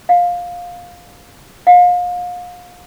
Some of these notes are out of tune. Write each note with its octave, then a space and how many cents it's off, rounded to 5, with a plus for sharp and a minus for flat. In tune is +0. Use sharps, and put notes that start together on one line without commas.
F5 +15
F5 +35